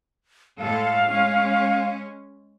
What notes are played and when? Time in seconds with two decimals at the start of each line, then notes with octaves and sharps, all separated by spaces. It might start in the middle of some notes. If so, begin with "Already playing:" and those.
0.59 A2 G#3 A4 F5
1.11 G#3 C#4